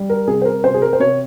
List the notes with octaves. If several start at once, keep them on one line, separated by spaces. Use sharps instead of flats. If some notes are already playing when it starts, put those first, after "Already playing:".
Already playing: G3
A#4
C3 G#4
C5
A#4
C3 C5
G#4
A#4
C5
C3 C#5